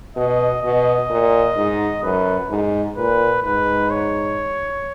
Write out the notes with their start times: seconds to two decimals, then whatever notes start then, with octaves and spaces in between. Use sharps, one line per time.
0.16 B2 D#5
0.63 B2 D#5
1.10 A#2
1.56 G#2
2.03 F#2 B4
2.50 G#2
2.97 A#2 B4
3.43 G#2 B4
3.90 C#5